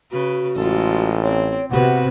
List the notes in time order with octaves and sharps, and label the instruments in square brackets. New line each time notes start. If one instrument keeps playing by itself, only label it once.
[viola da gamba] C#3 B4 [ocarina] F#4
[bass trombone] A1 [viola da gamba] G#3 F4 A4
[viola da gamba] C4 [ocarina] C#5
[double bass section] C3 [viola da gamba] B3 F#4 B4 [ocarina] F#5